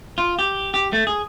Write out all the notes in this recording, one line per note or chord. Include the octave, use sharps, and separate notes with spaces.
F4
G4
G4
A3
G#4